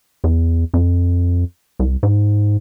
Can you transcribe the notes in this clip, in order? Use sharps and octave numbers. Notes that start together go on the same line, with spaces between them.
E2
F2
C2
G#2